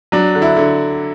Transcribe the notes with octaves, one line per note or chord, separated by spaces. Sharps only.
F#3 D4
D3
E4
D3